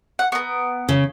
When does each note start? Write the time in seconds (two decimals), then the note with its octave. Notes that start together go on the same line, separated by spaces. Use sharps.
0.19 F#5
0.32 B3 A#4
0.89 C#3